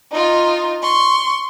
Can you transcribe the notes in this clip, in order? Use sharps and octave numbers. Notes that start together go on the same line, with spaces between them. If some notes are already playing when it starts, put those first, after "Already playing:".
D#4 F4
C6 C#6